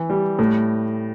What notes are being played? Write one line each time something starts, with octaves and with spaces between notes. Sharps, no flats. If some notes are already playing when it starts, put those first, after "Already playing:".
Already playing: E3
G3
A2